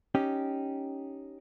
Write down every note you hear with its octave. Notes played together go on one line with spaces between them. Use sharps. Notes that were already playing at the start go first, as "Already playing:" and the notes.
C#4 D#4 G4